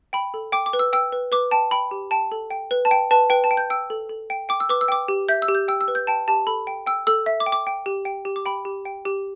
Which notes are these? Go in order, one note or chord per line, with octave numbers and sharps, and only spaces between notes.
G5 B5
A4
G5 D6
D6
B4
E6
G5 E6
B4
B4 D6
G5 A5
G5 B5
G4
G5 A5
A4
G5
B4
A5
G5
B4 A5
B4 G5
A5
G5
G6
G5 E6
A4
A4
G5
G5 D6
E6
B4 D6
E6
G5 D6
G4
E5 G6
E6
G4
G6
G5 E6
E6
B4
G6
G5 A5
G4 A5
A4 B5
G5
G5 E6
A4 E6
E5
D6
G5
D6
G5
G4
G5
G4
D6
G5 B5
G4
G5
G4